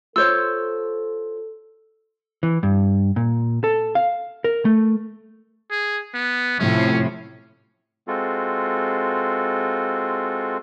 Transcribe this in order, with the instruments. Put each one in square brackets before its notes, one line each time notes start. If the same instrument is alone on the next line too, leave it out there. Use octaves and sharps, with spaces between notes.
[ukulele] F4 C5 C#5 [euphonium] A4 [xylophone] E6
[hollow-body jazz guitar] E3
G2
A#2
A4
F5
A#4
A3
[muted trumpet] G#4
B3
[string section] A2 C3 F3 [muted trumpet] C#4
[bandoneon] G#3 C4 F4 F#4 A4